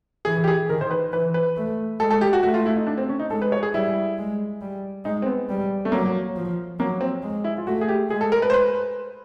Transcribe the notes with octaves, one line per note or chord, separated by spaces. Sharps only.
E3 G#4
G4
G#4
D#3 A#4
C5
B4
E3 B4
B4
A3
G#3 A4
A4
G4
F#4
A3 F#4
F4
E4
D#4
D4
C4
C#4
D#4
G#3 A4
B4
C#5
G#4
G3 E4
G#3
G3
G#3 D#4
C4
B3
G3
A3
F#3 A#3
F3
F#3 A#3
C4
G#3
E4
F4
A3 F#4
G#4
G4
G#3 G#4
A4
A#4
B4
C5
B4